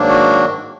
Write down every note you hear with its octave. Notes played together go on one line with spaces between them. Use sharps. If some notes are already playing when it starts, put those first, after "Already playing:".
Already playing: G#2 D#3 F#3 A#3 D4
F#4